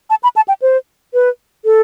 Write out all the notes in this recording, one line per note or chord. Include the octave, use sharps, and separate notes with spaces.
A5
B5
A5
G5
C5
B4
A4